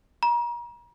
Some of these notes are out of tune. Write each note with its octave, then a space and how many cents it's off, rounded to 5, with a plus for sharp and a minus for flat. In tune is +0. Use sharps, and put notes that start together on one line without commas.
A#5 +40